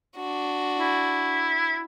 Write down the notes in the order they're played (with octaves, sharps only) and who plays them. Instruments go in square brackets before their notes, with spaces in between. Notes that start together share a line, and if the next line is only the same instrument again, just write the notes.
[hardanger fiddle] D4 F#4
[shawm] E4